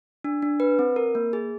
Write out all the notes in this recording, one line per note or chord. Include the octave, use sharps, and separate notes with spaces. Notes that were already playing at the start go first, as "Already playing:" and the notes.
D4
D4
B4
C4
A#4
A#3
G#4